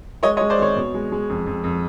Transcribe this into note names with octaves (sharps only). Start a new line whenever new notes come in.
G#3 C#5 D#5
C#5 D#5
G#3
C5 D5
G#1 C#5
B2
G#3
G#3
F2
F2
F2